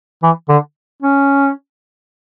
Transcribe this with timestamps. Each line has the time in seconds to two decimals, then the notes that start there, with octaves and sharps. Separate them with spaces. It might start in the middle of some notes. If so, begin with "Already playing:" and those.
0.23 E3
0.49 D3
1.02 C#4